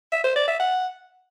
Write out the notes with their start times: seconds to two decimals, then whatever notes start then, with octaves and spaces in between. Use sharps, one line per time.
0.12 E5
0.24 C5
0.36 D5
0.48 E5
0.60 F#5